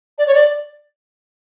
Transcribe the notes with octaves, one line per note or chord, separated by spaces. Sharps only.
D5
C#5
D5